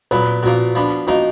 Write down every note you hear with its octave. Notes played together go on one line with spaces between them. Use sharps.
A#2 F#3 B3 B4
A#2 F3 A#3 F#4
F3 B3 D4
F3 A#3 D#4 F#4